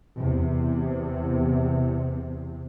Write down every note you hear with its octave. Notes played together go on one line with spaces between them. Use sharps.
E2 C3